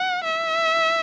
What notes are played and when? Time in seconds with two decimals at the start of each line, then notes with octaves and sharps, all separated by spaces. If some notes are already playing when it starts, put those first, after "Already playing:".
Already playing: F#5
0.24 E5